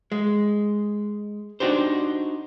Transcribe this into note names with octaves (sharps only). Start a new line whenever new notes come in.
G#3
D4 D#4 F#4 G4 C5